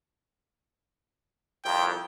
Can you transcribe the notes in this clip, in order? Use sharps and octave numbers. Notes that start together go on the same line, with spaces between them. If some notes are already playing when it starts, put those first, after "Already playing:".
C2 F2 G5